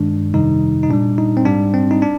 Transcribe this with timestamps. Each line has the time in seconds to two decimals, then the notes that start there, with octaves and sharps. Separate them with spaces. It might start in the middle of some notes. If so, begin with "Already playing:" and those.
Already playing: G2 D#3 G#3 D4
0.34 F2 C3 D#3 G3 D#4
0.83 D#4
0.90 A#2 G3 D4
1.18 D#4
1.37 C4
1.45 G#2 G3 D4
1.74 C4
1.91 D#4
2.02 D4